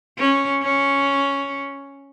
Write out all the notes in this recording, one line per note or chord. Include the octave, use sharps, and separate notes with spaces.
C#4
C#4